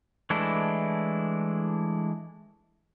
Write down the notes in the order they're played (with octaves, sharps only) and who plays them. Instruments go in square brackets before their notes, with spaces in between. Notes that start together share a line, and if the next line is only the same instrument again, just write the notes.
[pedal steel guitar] E3 G#3 A3 D4 E4